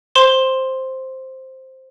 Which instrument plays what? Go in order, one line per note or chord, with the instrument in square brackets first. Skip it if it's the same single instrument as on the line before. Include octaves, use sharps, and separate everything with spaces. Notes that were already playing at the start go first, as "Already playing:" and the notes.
[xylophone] C5 C6 E7 G7